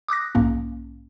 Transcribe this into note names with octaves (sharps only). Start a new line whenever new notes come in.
D6 D#6 F#6 A#6
B1 G#2 A#3 C#4